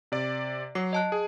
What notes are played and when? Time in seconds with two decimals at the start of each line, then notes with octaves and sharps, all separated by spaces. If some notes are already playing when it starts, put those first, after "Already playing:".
0.12 C3 D5
0.75 F#3 D6 C7
0.93 D#5 A5 F#6
1.12 G#4